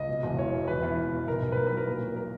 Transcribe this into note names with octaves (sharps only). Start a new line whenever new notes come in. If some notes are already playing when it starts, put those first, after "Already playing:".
Already playing: C#2 D#5
B2
E1
E2 C#5
B2
E1 B4
E2
E2
B2
B1 A#4
B1
B4
F#3 A#4
B4
F#3
A#4
A#2
F#3
A#4